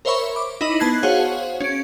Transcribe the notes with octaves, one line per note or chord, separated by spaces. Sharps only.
A#4 C5 C#5 E5 B5 C#6
D6
D#4 E4 D#5 B5 F#7
B3 A5 F#6 G#6 C7
F#4 G#4 C5 C#5 F5 F#5
C#4 D7